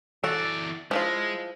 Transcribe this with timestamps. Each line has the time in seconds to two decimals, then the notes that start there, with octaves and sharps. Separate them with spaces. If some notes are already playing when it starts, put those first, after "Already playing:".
0.24 E3 F#4 A4 D5
0.91 F3 G#3 E4 F4